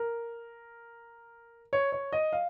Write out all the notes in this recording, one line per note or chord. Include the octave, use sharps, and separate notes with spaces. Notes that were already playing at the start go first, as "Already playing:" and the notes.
Already playing: A#4
C#5
C#5
D#5
F5